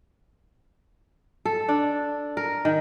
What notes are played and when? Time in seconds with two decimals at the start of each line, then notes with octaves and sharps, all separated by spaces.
1.45 A4
1.68 D4
2.37 A#4
2.65 D#3